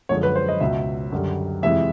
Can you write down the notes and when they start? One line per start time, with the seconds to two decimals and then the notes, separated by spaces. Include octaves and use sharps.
0.09 F#2 D3 F3 G#3 C#5
0.23 B4
0.36 C5
0.48 D#5
0.60 C#2 B2 F#3 E5
1.12 F#2 D3 G3
1.62 F2 C3 E3 G#3 E5